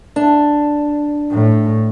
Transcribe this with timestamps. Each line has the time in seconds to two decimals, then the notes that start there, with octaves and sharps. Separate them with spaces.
0.16 D4
1.31 A2